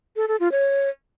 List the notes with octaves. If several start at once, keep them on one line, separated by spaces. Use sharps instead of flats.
A4
A4
F4
C#5